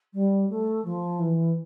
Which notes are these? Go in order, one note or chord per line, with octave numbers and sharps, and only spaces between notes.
G3
A3
F3
E3